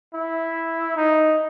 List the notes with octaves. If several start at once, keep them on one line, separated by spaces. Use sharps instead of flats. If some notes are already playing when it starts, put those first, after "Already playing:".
E4
D#4